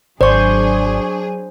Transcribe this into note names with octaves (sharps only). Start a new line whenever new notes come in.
G#1 F#3 D4 G#4 C5 D5 C#6